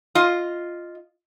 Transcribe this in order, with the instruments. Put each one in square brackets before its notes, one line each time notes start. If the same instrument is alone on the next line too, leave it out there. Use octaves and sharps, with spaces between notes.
[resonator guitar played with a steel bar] F4 D#5